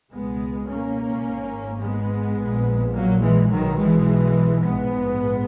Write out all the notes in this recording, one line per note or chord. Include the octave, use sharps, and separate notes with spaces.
C#2 B2 G#3 B3
A#3 C#4
G#1 G#2
G#3 B3
A#1 A#2
F#3 A#3
E3 G#3
B1 B2 D#3 F#3
E3 G#3
A#1 G#2 G#3 B3